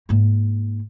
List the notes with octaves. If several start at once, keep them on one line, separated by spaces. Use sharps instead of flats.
G#2 A#3